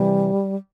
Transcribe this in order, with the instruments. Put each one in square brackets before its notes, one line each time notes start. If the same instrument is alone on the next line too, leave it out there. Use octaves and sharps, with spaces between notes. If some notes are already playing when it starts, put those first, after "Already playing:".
Already playing: [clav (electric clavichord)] C3 E3 [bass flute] G3